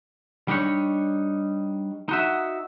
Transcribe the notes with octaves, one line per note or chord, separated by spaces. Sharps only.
G3 D4 D#4 C#5
D#4 F#4 E5